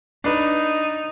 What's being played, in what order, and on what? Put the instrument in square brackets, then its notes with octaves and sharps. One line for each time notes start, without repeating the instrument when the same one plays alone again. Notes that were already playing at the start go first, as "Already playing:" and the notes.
[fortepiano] D4 B4 [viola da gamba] D#4